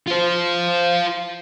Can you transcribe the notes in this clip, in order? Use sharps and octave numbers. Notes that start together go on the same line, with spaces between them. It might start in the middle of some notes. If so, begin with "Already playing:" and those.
F4 C5